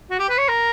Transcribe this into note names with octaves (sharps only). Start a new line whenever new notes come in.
F#4
G4
B4
C#5
A#4